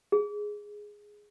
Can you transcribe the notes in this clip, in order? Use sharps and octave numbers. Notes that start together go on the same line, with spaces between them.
G#4